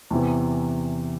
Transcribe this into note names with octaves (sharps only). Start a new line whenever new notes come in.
E2 C3 E3